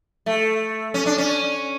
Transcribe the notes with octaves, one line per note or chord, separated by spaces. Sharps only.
A3
C#4
D4
C#4